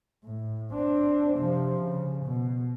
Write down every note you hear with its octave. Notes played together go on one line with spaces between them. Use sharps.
A2
C4 D4
C3 F3
C#3
B2